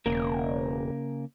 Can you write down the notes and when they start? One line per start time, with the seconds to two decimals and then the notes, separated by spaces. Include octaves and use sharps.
0.06 E1 C#3 A#3 A#4